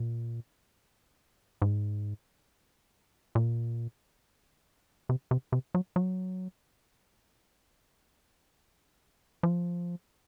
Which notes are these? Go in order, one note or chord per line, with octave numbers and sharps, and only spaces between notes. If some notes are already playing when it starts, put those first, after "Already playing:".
Already playing: A#2
G#2
A#2
C3
C3
C3
F#3
F#3
F3